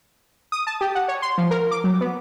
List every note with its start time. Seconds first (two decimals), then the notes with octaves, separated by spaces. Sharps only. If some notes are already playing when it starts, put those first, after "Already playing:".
0.52 D#6
0.67 A5
0.81 G4
0.95 F#5
1.08 C#5
1.22 C6
1.38 F3
1.51 A#4
1.71 D6
1.84 F#3
2.01 B3